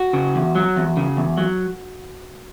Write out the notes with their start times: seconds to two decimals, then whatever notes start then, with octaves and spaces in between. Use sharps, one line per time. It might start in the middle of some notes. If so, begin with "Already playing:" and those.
Already playing: F#4
0.13 C#3
0.35 E2
0.55 F#3
0.76 E2
0.97 C#3
1.17 E2
1.38 F#3